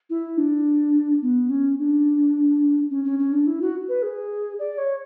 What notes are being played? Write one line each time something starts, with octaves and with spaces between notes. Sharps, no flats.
E4
D4
B3
C#4
D4
C#4
C#4
C#4
D4
E4
F#4
B4
G#4
D5
C#5